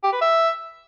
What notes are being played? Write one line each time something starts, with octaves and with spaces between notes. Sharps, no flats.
G4
B4
E5